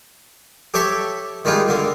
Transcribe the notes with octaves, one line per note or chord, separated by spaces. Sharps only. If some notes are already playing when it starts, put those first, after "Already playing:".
G4 A4 C#5 E5
D#3 G3 G#3 F4
D3 A#3